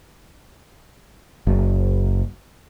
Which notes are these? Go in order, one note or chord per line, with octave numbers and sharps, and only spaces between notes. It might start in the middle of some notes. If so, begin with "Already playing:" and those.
F#1